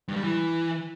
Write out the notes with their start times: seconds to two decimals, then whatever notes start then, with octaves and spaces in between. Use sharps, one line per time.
0.08 G2
0.16 G3
0.24 E3